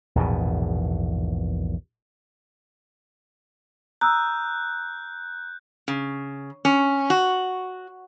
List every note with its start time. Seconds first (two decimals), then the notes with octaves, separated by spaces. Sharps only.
0.15 A#1 E2 G#2 B2
4.01 A#5 D#6 E6 F#6 G6
5.88 C#3
6.65 C#4
7.10 F#4